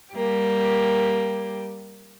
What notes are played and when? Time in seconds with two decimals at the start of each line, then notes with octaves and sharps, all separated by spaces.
0.13 G3 A#3 G4